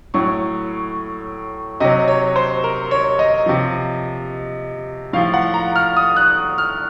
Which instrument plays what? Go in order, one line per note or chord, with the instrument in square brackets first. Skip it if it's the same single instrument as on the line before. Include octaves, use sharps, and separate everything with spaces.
[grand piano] A2 F#3 C#6
C3 F#3 D#5
C#5
C5
A#4
C#5
D#5
C3 F3
A2 F3 F5
F#5
A#5
F6
D#6
F#6
F6